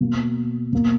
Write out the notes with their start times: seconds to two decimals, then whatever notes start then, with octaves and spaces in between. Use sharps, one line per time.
0.01 B2 A#3
0.72 B2 A#3